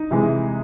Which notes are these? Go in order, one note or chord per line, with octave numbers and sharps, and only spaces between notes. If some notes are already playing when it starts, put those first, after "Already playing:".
Already playing: D#4
C3 E3 G#3